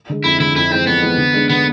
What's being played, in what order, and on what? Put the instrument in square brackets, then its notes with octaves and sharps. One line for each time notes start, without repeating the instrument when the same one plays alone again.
[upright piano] D3 G#3
[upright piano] F2 [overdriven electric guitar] E4
[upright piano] D3 G#3 [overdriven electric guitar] E4
[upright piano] F2 [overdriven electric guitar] E4
[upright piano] E3 G#3 [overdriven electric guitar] C4
[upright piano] F2 [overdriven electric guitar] B3
[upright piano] E3 G#3
D3
G#3 D4
[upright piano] D3 [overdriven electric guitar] B3